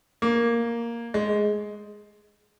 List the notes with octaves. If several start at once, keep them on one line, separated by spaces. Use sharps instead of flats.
A#3
G#3